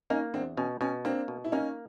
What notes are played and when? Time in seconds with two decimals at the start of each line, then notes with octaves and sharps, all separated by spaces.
0.10 A#3 C#4 D#4
0.34 E2 C4 D4
0.57 B2 C#4
0.81 B2 C#4
1.05 A#3 C4 D4
1.28 B2
1.44 E4
1.52 A#3 C#4 D#4